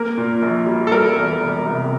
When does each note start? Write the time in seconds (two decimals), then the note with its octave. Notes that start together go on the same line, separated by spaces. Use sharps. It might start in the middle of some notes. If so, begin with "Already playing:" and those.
Already playing: A#3 A#4
0.18 A#2
0.42 A#1
0.66 G3
0.87 A4
0.92 G3 A#4
1.16 E2
1.41 E1
1.66 C3